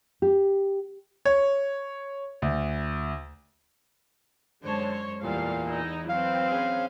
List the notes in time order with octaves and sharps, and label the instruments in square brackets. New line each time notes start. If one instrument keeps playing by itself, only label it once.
[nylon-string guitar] G4
[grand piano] C#5
D2
[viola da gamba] F#2 G#3 C5 [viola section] D3 C#5 A5
[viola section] C#5
[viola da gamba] E2 [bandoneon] A#2 [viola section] G3 A4 F5
[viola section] D#4 E4
[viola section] F#3 C4 B4 [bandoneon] F5
[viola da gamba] C#4 G#4 C5